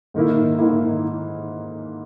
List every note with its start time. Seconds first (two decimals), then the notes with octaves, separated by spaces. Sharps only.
0.14 G#2 D#3 A#3 E4
0.59 G#2 D#3 A#3 E4